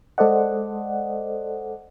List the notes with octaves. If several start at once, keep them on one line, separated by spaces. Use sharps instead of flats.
G#3 A4 C5 D5 D#5 F#5